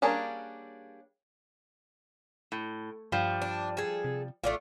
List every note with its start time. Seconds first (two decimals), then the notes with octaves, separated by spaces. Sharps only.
0.02 G3 A#3 C#4 D4 G#4
2.52 A2
3.12 G2 F3 G3
3.42 D4
3.77 G#4 A4
4.04 C3
4.44 A1 A3 D4 F4